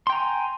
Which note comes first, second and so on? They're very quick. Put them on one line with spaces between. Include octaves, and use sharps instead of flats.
C6 G5 A#5 G#5